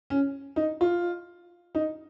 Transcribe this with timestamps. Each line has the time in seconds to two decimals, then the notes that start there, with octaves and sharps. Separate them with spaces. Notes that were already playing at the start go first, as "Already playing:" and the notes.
0.10 C#4
0.56 D#4
0.81 F4
1.75 D#4